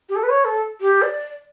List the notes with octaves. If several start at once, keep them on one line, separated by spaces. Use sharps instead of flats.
G4
A4
B4
C#5
A4
G4
D5